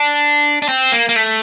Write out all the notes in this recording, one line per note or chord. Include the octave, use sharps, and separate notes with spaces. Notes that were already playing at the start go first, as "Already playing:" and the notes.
Already playing: D4
D4
C4
A#3
A#3
A3